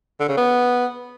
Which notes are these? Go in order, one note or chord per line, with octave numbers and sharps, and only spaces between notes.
D3
C#3
B3